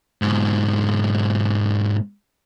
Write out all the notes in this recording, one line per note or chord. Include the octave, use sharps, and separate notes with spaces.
G#2 B2